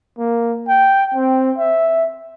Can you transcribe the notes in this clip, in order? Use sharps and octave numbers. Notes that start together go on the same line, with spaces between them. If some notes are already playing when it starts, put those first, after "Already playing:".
A#3
G5
C4
E5